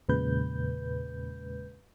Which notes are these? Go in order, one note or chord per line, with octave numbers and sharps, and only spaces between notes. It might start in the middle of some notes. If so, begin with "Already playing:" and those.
E2 A#2 C#3 G#3 B4 G6